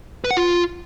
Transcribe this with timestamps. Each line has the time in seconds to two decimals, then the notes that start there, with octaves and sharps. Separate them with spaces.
0.24 B4
0.31 F#5
0.37 F4